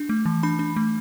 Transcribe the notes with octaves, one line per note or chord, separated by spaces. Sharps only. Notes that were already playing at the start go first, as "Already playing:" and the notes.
Already playing: D4
A3
E3
D4 B5
D4
A3